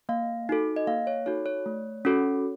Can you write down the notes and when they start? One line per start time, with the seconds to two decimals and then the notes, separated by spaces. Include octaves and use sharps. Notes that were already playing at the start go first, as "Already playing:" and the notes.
0.09 A#3 F5
0.49 D#4 F#4 A4
0.76 D#5
0.87 A#3 F5
1.07 C#5
1.26 D#4 F#4 A4 C#5
1.46 C#5
1.66 A3
2.05 C#4 F#4 A4